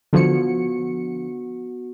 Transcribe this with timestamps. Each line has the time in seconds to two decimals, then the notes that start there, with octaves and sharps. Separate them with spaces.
0.13 D3 F3 B3 F#4 C#7